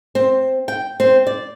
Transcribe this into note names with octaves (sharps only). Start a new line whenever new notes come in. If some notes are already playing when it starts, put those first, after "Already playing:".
C4
G5
C4
D5